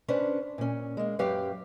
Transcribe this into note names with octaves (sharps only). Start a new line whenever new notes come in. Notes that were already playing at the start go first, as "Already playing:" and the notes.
C#4 D4 B4 C5
A#2 C#4
G#3 A#3
F#2 F#3 G4 B4 F5 G5